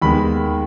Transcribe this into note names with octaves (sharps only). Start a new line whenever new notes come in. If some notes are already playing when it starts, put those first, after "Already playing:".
D#2 D#3 G#3 B3 B5